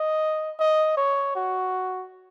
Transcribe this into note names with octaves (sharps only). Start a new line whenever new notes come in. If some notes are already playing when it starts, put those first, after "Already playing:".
Already playing: D#5
D#5
C#5
F#4